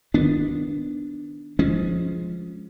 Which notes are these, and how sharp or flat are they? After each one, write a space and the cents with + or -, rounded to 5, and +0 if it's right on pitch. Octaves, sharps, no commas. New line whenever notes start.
D#3 +0 B3 +0 D4 -5
F3 +0 G#3 +5 C#4 +0